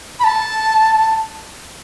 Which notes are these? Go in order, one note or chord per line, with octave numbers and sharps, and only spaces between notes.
B5
A5